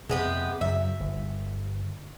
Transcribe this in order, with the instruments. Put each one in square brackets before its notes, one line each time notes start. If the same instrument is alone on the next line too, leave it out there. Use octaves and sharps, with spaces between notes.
[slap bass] F2 C3 [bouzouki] G#3 B3 G4
[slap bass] F#2 C#3 F#3 [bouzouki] E5
[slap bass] G1